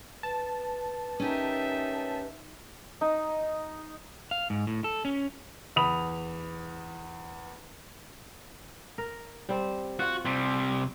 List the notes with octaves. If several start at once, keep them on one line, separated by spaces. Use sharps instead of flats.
B4 A5
C#4 D#4 G4 A#4 E5
D#4
F5
G#2
A2
A4
C#4
E2 B5 D#6 F7
A#4
G3 C4
F4 F#4 F#5
C3 G3